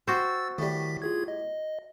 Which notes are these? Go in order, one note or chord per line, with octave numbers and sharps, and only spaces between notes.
F#4 C5 G5 D6 E6 A6
A2 D#3 G3 B6
F4 G#4 G#6
D#5